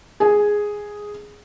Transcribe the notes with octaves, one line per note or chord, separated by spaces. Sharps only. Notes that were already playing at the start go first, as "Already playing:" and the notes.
G#4